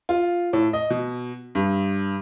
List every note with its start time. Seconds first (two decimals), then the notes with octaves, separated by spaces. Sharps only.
0.09 F4
0.53 A2
0.73 D#5
0.90 B2
1.55 G2